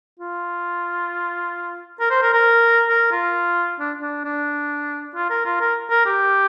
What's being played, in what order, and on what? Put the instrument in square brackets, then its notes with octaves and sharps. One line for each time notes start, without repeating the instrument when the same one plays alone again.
[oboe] F4
A#4
C5
A#4
A#4
A#4
F4
D4
D4
D4
F4
A#4
F4
A#4
A#4
G4